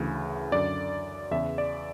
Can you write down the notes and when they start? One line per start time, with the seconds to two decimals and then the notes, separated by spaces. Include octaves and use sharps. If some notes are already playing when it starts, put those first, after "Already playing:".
Already playing: D2 C#3 E3
0.52 F#2 D3 D5
1.31 E2 C#3 E3 E5
1.58 D5